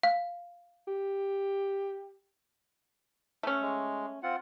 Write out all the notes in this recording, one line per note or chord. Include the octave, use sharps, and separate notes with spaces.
F5
G4
A3 C#4
G#3
C4 F4 F#5